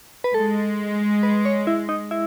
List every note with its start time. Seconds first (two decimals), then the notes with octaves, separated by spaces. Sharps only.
0.24 B4
0.34 G#3 A4
1.23 B4
1.45 C#5
1.67 E4
1.89 D#4
2.11 E4